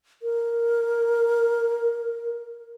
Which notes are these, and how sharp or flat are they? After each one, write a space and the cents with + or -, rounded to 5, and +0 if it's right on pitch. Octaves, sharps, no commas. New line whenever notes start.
A#4 +0